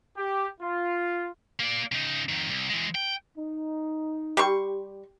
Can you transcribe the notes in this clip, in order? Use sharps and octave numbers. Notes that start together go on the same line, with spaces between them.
G4
F4
A#3 D5
C#3 D#4
F2 D#3
C2
E3 G#3
G5
D#4
G3 G4 C6 C#6